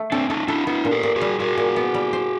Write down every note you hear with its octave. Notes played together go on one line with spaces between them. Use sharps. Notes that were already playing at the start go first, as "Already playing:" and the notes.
Already playing: A3
C4 D4 A4
C#4 D#4 A4
D4 E4 A4
B3 D4 E4
A#2
G4 A4
A#2
F#4 G#4
G3
A#2 F#4 G#4
A#2
B3
G3
C5